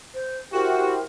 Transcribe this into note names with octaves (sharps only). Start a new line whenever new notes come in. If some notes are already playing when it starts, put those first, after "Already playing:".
C5
E4 F#4 G4 A#4 C5